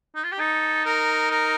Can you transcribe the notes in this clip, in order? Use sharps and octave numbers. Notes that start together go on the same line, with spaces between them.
D#4
F4
G4
D#4 A4
A#4
A#4